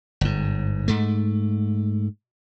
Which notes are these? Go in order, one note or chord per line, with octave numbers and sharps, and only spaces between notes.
G1 G#2
G#2 A3